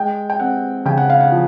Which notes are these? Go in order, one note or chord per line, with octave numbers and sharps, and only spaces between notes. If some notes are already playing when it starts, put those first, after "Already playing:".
Already playing: G#3 G5
G5
C4 F#5
C#3 G5
F#5
F5
F#5
F3